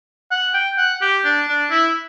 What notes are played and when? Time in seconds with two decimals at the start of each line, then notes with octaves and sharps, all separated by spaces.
0.31 F#5
0.54 G5
0.78 F#5
1.02 G4
1.25 D4
1.48 D4
1.71 E4